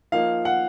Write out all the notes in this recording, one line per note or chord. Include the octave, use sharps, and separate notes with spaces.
F3 A#3 D#4 F5
F#5